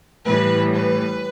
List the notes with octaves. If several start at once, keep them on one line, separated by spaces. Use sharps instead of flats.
A2 E3 G3 B4
B4